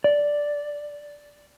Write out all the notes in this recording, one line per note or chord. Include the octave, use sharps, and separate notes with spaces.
D5